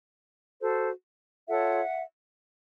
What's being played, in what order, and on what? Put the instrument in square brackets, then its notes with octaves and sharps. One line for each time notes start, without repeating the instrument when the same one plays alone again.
[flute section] F#4 A4 C5
F4 A4 C#5 E5 F#5